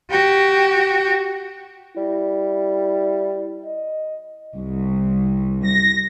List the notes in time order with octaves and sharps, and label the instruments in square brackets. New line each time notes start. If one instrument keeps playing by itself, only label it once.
[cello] F#4 G4
[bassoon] G3 [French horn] E4
[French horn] D#5
[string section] C2
A#6